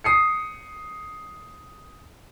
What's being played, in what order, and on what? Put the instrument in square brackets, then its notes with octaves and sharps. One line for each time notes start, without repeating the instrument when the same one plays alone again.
[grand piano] D#6 C7 C#7